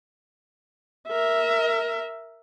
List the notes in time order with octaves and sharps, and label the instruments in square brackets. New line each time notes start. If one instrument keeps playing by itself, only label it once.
[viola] A#4 E5